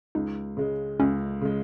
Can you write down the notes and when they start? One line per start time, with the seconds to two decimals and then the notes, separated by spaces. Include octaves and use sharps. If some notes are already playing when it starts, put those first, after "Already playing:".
0.15 C#2 D#4
0.57 C#3 G#3
1.00 C#2 C#4
1.41 C#3 G#3